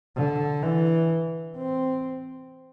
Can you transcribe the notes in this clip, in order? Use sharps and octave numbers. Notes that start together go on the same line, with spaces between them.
D3
E3
C4